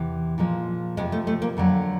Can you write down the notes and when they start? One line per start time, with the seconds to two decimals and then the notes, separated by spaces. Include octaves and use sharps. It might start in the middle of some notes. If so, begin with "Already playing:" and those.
Already playing: E2 C3 E3
0.38 A#2 F3 G#3
0.97 F2 C3 F3 G#3
1.12 A3
1.27 A3
1.42 A#3
1.57 F2 D3 F#3